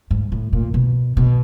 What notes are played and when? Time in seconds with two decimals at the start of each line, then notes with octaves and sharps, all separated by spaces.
0.11 G#2
0.32 A2
0.53 A#2
0.74 B2
1.17 B2